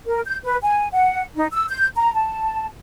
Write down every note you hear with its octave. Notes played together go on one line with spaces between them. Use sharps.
A#4
G6
B4
G#5
F#5
D#4
E6
G6
A#5
A5